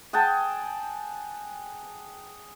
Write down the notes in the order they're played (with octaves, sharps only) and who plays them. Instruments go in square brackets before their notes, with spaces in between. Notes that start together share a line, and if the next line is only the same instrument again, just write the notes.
[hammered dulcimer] G#4 F#5 G5 A5